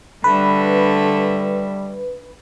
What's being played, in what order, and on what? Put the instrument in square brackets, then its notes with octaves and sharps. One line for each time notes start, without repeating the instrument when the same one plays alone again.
[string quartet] D3 A3 E5 [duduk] G3 [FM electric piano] B4